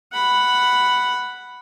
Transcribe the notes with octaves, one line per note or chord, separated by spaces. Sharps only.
F#5 B5